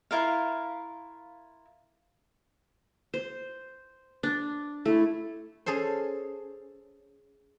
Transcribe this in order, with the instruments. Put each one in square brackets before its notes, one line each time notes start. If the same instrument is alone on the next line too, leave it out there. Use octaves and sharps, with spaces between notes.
[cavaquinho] E4 F4 A#4 F5
[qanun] C5
D4
[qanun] A3 [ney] E4
[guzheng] C#4 G#4 A4 C5